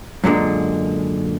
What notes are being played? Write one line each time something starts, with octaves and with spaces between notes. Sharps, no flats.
F#2 A#2 D3 G#3